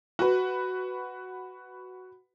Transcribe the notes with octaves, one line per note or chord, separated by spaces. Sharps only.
F#4 B4